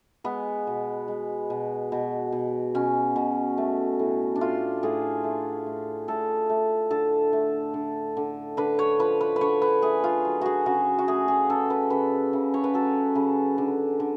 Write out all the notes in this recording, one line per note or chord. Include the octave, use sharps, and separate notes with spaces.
G#3 B3
B2
G#3
B2
B2
B2
B2 C#4
B2
A3
A2
D4
A2 F4
A2 G#4
A3
A2
A2 A4
A3
D3 A4
A3
D3
D3
D3 B4
C#5
F3 B4
B4
B4
D3 C#5
B4
A3 G#4
F4
F#3
F#4 G#4
C#3 F#4
F#4
A3 G#4
G#4
C#3 A4
B4
C#3 B4
C#3
C#5
B4
F#3 A4
C#3
D3
D3